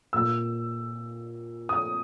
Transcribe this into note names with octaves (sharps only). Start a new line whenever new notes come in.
A#2 E6
D#6